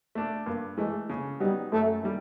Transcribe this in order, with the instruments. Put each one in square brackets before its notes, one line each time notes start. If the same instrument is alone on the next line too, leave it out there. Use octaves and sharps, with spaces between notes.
[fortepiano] A3 D4
[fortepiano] G2 [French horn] A#3
[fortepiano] E3 A3 [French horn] G#3
[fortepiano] C#3
[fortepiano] F#3 B3 D#4 [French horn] G3
[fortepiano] F#2 [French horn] A3
[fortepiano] D#3 G3